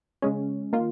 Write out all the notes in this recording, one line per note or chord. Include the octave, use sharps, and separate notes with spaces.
C#3 G#3 C#4
D#3 A#3 F4